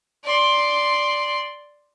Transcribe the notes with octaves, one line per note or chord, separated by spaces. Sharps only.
D5 C6